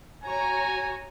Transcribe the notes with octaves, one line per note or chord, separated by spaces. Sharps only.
F#4 C#5 G#5 A#5